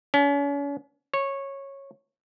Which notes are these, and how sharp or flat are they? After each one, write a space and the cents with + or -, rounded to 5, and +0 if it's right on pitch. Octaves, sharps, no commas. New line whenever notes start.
C#4 +40
C#5 -10